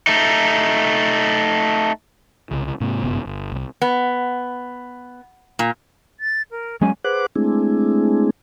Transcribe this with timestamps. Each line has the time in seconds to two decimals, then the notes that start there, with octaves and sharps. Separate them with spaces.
0.07 A3 D#4
2.51 C2 C#3
2.80 G#2 C3 A#3
3.03 G1 F#2 C3 B3
3.25 G1
3.52 C2
3.82 B3
5.59 A#2
6.20 A6
6.51 A#4
6.81 F#3 G#3 C#4 G#5
7.04 G#4 B4 C5 F#5 D6 F#6
7.36 G#3 A3 C4 D4 E4 G#4